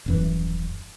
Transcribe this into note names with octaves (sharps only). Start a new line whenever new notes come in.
D#1 F#2 E3